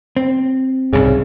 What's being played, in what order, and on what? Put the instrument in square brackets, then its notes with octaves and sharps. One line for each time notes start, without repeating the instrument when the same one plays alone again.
[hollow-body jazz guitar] C4
[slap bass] C2 G#2 [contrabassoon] C#3